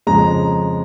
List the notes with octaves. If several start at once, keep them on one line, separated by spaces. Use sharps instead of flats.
F2 C#3 G#3 A#5